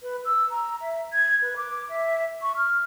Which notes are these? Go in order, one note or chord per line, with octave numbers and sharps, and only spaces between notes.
B4
E6
A#5
E5
G#6
B4
D6
E5
C#6
F6